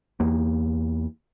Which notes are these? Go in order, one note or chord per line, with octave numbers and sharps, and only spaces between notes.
E2 A#3